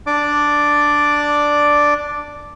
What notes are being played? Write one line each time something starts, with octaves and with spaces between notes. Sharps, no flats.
D4 D5 D6